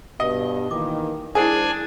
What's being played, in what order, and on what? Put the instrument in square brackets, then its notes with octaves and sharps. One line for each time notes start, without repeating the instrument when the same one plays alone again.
[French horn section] G2 B2 [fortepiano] D#5
[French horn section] D#3 E3 A#3 [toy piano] D6
[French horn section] G#2 C5 [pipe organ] D4 G#5 [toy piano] E4 A#4 [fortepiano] G#4